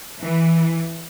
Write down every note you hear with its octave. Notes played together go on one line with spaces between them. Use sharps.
E3